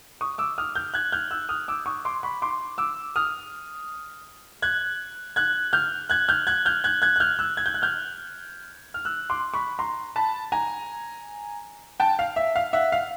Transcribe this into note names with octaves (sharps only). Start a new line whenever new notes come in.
C#6 D#6
D6 E6
D#6 F6
F6 G6
F#6 G#6
F6 G6
E6 F#6
D#6 F6
D6 E6
C#6 D#6
C6 D6
B5 C#6
C6 D6
D6 E6
D#6 F6
F#6 G#6
F#6 G#6
F6 G6
F#6 G#6
F6 G6
F#6 G#6
F6 G6
F#6 G#6
F#6 G#6
F#6
F6 G6
E6 F#6
G#6
G6
F#6
F6 G6
F6
E6 F#6
C6 D6
B5 C#6
A#5 C6
A5 B5
G#5 A#5
G5 A5
F5
E5
F5
E5 F#5
F5